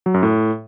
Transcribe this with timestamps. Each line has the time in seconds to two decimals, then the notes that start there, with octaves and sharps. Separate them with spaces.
0.06 F#3
0.14 F#2
0.23 A2